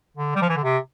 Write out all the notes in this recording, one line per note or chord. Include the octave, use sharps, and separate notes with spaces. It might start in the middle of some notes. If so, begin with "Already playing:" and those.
D3
G3
F3
E3
D3
C3